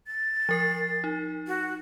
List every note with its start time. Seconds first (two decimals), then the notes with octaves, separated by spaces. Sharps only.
0.07 A6
0.49 F3 A#4 C7
1.04 D#4
1.47 F#4